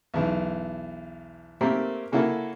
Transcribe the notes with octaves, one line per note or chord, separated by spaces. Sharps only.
B1 E2
A3 A#3 C4 G4 A#4
C#3 A#3 C#4 E4 F#4 A4